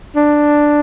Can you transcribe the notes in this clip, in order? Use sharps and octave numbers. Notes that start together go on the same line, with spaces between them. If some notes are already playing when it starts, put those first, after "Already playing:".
D4